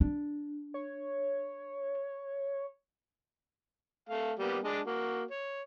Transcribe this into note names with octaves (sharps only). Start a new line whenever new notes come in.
D4
C#5
A3 F5
G3 A#3 B3
G#3 D4
A#3 F#4
C#5